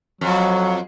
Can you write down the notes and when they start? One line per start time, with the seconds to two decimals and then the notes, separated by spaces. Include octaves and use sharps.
0.21 F2 F#3